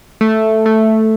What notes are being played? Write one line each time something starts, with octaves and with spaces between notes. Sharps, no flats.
A3
A3